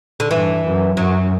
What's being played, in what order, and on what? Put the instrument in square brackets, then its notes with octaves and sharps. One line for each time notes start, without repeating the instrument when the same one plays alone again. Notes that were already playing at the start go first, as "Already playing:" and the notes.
[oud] D3
[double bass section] G2 [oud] E3
[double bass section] F#2
[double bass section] F#2 [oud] F#3